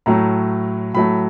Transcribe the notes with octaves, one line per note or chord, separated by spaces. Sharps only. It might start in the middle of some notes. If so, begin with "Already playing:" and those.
A2 F#3 A3 A#5
A2 F#3 A3 B5